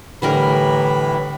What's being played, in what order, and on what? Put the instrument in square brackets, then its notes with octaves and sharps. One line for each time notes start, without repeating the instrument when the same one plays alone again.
[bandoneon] A2 E3 [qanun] D3 G3 A#4 [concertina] B5